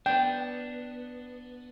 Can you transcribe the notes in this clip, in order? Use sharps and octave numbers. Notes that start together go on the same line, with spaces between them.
B3 D4 G5